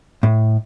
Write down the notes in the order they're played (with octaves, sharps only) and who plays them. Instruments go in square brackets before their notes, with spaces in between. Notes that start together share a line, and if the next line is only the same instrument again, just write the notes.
[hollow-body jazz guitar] A2